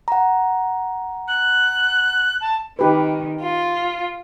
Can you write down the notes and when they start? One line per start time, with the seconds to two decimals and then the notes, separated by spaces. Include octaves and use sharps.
0.08 F#5 A#5
1.27 F#6
2.40 A5
2.79 D#3 D#4 G4 B4
3.42 F4